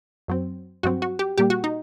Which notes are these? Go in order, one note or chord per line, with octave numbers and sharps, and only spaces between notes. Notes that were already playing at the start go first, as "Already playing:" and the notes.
F#2 F#3 C4
G2 F#3 C4 F#4
F#4
G4
A#2 G3 A#3 G4
F#4
D#4